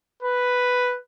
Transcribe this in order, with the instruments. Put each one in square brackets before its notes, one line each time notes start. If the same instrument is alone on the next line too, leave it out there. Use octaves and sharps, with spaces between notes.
[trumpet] B4